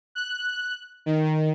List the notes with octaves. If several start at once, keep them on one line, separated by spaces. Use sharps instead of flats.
F#6
D#3